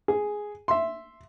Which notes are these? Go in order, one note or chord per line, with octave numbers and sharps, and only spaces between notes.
G#4
E5 C6